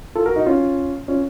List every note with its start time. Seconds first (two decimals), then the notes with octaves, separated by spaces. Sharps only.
0.15 F4 A4
0.26 F#4 A#4
0.36 D#4 F#4
0.46 C#4 F4
1.08 C#4 F4